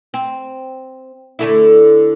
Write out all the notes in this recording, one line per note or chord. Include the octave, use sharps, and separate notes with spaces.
C4
D3 A3 E4